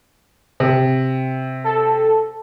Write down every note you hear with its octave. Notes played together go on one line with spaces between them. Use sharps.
C3
A4